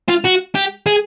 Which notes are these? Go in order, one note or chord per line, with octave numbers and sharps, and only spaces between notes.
F4
F#4
G4
G#4